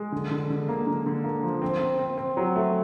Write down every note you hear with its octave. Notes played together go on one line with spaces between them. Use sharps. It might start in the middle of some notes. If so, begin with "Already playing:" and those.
Already playing: G#3
D3
D3
D3
A#3
D3
D3
A#3
F3
C4
C4
C4
C4
F#3
A3